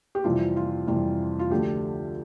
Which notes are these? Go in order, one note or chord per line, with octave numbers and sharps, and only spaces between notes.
G4
F2 C3 E3 G3 F4
F4
F2 C3 E3 G3
F4
D2 D3 F3 G4